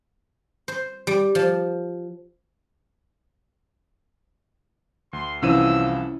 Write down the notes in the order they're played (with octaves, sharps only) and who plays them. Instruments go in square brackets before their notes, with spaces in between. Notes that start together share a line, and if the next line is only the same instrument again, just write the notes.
[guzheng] C5
G3
F3
[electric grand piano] D2 [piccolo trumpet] C6
[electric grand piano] C2 E3 D#7 [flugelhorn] F3 [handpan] C#4 E4 [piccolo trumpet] E6